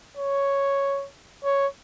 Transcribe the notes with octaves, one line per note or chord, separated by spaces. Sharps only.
C#5
C#5